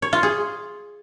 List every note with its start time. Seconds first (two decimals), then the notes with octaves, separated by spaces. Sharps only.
0.02 C#5
0.13 F4
0.23 G#4